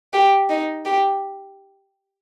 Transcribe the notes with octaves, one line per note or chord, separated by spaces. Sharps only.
G4
D#4
G4